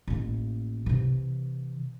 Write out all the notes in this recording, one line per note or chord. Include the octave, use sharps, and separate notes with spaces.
A1 A#3
C3 E3